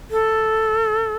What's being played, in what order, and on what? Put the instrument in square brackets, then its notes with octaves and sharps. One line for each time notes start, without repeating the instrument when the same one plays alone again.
[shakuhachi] A4